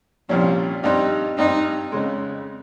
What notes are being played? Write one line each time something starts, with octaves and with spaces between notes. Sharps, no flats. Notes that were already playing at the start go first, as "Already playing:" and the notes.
C2 A#2 F3 G3 C#4
G2 G3 C4 D#4
G2 G3 C4 D#4
F2 C#3 G#3